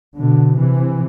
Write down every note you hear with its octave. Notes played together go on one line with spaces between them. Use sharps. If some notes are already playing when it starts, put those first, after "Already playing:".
B2 D3
C3 E3